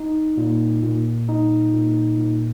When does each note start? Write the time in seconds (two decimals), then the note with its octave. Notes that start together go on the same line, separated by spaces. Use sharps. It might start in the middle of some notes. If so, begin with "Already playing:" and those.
Already playing: D#4
0.37 A#2
0.83 A#2
1.29 D#4
1.73 A#2
2.18 A#2